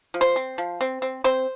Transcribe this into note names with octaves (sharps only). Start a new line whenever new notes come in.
F3
C5
C4
F3
C4
C4
C4 C5